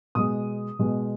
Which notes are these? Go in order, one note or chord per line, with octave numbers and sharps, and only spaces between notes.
B2 G#3 D#6
B2 G#3